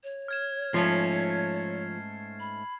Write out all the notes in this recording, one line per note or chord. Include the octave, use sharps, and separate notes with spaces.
C#5
F6 G#6 E7
G#2 F3 A3 C#4 C7
B5